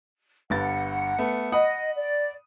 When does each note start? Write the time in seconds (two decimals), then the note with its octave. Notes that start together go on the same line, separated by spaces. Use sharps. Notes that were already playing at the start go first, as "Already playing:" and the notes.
0.50 G1 G2 F#5 A6
1.19 A3 B3
1.52 D#5 F#5 B5 D#6
1.96 D5